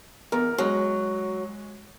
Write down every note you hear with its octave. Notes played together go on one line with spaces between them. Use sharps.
E2 A#4
F#3 G#3